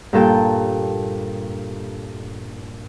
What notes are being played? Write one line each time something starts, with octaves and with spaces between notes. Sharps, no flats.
G2 A#2 A4 G5